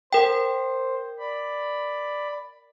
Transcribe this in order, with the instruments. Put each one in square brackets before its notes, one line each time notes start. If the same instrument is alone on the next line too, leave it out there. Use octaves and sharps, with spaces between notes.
[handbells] A#4 G5 [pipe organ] C5
[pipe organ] D5 B5